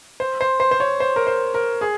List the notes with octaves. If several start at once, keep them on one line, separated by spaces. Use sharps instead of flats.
C5
C5
C5
C5
C#5
C5
A#4
C5
A#4
G#4